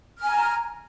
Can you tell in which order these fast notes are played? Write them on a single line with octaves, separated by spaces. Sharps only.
F6 G#5 A#5